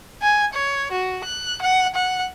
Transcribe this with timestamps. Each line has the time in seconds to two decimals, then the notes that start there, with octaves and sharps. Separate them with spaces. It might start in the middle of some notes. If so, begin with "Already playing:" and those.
0.22 G#5
0.54 C#5
0.92 F#4
1.24 F#6
1.62 F#5
1.95 F#5